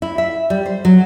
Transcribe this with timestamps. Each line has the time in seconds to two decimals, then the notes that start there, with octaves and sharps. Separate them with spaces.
0.02 E4
0.18 E5
0.50 G3
0.66 C5
0.85 F#3